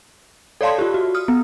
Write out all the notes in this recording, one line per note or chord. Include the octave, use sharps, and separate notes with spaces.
A4 C#5 D5 F5 A5 C6
F4 G4
F#4
D#6 F6
B3